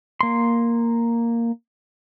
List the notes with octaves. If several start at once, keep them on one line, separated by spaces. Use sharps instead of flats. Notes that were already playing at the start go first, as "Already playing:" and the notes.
A#3 C6